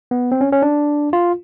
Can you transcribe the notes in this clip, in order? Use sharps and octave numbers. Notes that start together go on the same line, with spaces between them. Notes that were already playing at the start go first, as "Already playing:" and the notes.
B3
C4
C#4
C#4
D4
F4